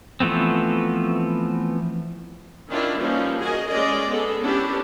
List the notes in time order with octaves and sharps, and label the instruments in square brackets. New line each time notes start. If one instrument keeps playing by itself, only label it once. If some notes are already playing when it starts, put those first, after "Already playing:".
[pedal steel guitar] E3 F3 A3 B3 C4
[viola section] D#3 C#4 D4 E4 F4
E3 F3 G3 A#3 C#4 D#4
F#4 G#4 A#4 D#5 G#5
G#3 C#4 G#4 D5 D#5
B3 G#4 A4
B3 C#4 D4 E4 G4